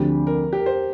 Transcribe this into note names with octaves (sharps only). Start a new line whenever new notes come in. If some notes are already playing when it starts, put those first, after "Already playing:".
Already playing: D2 D3 F3 C4 G4
A#4
G4
A#4
C5